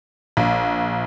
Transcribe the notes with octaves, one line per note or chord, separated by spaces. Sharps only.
A#1